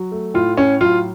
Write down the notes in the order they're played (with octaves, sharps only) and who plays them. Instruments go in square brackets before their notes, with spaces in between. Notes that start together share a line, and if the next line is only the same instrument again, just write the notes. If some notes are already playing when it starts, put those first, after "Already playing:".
Already playing: [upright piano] F#3
A3
A2 F4
A2 C#4
F#3 F4